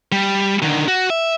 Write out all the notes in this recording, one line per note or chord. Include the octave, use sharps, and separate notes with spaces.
G3
D3 D#3
F#4
E5